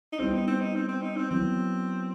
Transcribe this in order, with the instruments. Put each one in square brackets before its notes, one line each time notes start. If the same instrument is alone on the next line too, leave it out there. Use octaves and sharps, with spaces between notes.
[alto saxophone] D#4
[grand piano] G3 B3 E4 G4 C5 [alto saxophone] C4
[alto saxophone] D#4
C4
D#4
C4
C4
D#4
C4
[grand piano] F#3 B3 E4 [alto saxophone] C4